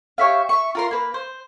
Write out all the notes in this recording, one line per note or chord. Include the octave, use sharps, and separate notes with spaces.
G4 C#5 E5 F5
E5 C#6
F4 A#4 C6
A#3 B4
C5